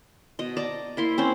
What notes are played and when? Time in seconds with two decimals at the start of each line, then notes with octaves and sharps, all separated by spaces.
0.39 B2 D#5
0.57 D5 A5 A#5
0.97 A#3 E4 C6
1.18 C4 C#4 C5